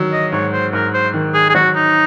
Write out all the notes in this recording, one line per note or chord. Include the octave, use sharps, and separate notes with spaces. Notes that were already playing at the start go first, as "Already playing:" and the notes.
Already playing: D#3 F#3
D#5
G#2 C#5
C5
G#2 A#4
C5
D#3
G#4
G#4
F#3 F#4
D#4